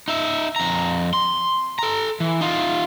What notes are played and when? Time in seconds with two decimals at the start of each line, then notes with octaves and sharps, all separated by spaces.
0.08 D#4 E5
0.56 F2 A#5
1.13 C6
1.79 A4 A#5
2.20 E3
2.41 D#4 F4